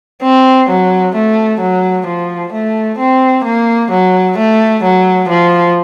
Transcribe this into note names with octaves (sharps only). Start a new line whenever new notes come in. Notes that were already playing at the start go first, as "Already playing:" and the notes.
C4
F#3
A3
F#3
F3
A3
C4
A#3
F#3
A3
F#3
F3